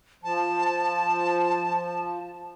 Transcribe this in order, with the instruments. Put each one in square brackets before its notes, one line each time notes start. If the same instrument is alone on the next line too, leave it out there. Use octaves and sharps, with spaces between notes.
[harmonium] F3 [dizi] A5